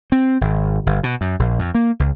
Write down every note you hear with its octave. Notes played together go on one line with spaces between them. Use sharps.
C4
G#1
G1
B2
F#2
A#1
F2
A#3
C#2